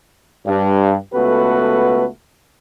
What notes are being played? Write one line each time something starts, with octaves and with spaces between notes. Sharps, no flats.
G2
C#2 A3 B3 F#4 A4 B4